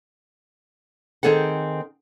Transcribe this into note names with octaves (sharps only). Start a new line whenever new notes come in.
D#3 C4 G#4 A4 F#5